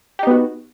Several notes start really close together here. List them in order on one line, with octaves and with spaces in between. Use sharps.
G4 D#4 B3 F#4